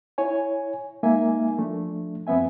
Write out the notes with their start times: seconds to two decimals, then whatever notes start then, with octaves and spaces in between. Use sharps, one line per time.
0.18 E4 C#5 G#5
1.03 G#3 A#3 D#4 A#4 E5 G#5
1.58 F3 A3 D4
2.27 F#2 F3 B3 C4 E5 G#5